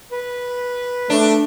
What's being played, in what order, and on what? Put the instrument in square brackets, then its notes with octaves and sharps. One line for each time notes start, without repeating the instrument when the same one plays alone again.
[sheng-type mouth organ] B4
[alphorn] A3 [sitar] D4